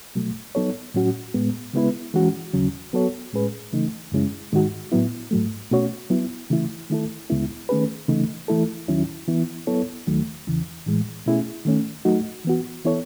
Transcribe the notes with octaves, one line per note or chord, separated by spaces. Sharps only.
B2 F#3 A3
F#3 B3 D#4 A4 C#5
A2 F#3 C#4 F#4
A2 G#3 B3
C#3 G#3 B3 E4 B4
E3 G#3 C#4 F#4
D#2 C#3 F#3 C#4
F#3 B3 F#4 A4 C#5
A2 G#3 C#4 G#4 B4
C#3 E3 A3 D#4
F#2 C#3 G#3 C#4 E4
G#2 D#3 G#3 D#4 F#4
A2 F#3 B3 E4
G#2 F#3 A3
B2 A3 C#4 F#4 C#5
F#3 B3 E4
C#3 E3 A3 E4
D#3 A3 E4 A4
C#2 C#3 G#3 B3 E4
D#3 A3 C#4 G#4 B4
C#3 E3 A3 D#4
E3 A3 E4 A4
D#2 D#3 F#3 C#4 E4
E3 B3 E4
F#3 B3 E4 A4 C#5
D#2 D#3 F#3 A3
E2 C#3 E3
A2 E3 G#3
B2 A3 C#4 E4 G#4
D#3 A3 C#4
F#3 A3 D#4 F#4
E3 B3 F#4
E3 B3 E4 A4 C#5